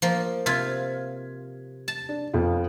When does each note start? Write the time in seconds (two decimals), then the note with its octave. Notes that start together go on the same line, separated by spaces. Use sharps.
0.02 F3 A#3
0.46 C3 F4 G#6 B6
1.88 A5
2.09 D4
2.33 F2 B3 F4